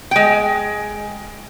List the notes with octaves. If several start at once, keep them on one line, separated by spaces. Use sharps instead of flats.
G#3 G5